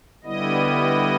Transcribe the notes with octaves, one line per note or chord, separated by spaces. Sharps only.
D3 G3 B3 E4 D#5